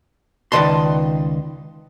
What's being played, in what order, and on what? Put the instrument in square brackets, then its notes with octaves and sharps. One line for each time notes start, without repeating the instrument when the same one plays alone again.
[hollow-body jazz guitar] C#2 D#3 B4 D5 A5 C6